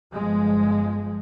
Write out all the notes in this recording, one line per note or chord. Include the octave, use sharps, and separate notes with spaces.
G1 F3 G#3